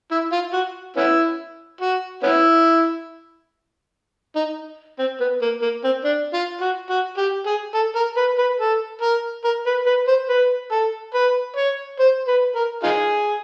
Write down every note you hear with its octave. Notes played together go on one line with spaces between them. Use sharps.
E4
F4
F#4
B3 C#4 E4
F#4
B3 C#4 E4
D#4
C4
B3
A#3
A#3
C4
D4
F4
F#4
F#4
G4
G#4
A4
A#4
B4
B4
A4
A#4
A#4
B4
B4
C5
B4
A4
B4
C#5
C5
B4
A#4
D#4 F4 G#4